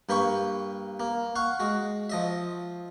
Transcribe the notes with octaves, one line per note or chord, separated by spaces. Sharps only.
G2 A#3 G5 B5 C#6
A#3
F5 F#5 C#6
G#3 F#4
F3 D#5 E5